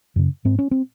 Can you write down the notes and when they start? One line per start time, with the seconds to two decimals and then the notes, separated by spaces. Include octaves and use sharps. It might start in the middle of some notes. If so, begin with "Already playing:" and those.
0.16 F#2 C#3
0.45 G#2 C4
0.59 C#4
0.71 C4